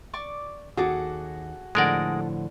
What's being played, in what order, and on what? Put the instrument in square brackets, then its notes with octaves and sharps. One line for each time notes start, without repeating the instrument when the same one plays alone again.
[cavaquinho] D5 C#6 D6
[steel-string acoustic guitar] D#2 F#5 [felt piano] F#4 [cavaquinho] G#4 A4 D6
[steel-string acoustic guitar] A2 D3 F3 [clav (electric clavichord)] G#3 A#4 D5 [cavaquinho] A4 F#5